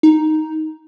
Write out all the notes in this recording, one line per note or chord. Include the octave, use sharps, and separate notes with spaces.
D#4